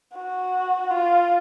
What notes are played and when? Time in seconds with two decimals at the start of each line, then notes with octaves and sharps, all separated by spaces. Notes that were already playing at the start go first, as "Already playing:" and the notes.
0.16 F#4
0.91 F4